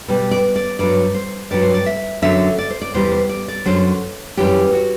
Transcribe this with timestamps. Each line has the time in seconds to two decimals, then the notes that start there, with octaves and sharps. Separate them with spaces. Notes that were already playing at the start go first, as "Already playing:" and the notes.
0.08 B2 G3
0.31 D5
0.56 D5
0.79 G2 F#3 D5
1.15 C5
1.51 G2 F#3 D5
1.62 C5
1.74 D5
1.86 E5
2.22 F#2 D3 F#3 E5
2.58 D5
2.70 C5
2.82 D5
2.94 E2 C3 E3 G3 C5
3.12 C5
3.29 D5
3.48 D5
3.65 F#2 D3 F#3 C5
4.37 F#2 E3 G3 G4
4.73 F#4